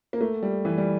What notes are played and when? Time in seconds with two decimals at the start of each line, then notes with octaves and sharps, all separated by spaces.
0.13 A#3
0.21 A3
0.43 G3
0.65 E3
0.78 G3